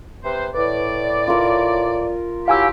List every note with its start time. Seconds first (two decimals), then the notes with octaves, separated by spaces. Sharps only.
0.24 C3 B4 C5
0.55 A2 B4 D5
1.28 F4 A#4
2.48 F#3 E4 G4 F5 G#5 E6